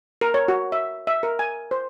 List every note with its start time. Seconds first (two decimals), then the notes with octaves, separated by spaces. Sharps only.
0.21 A#4
0.34 C#5
0.48 F#4
0.72 E5
1.07 E5
1.23 A#4
1.39 G#5
1.71 C5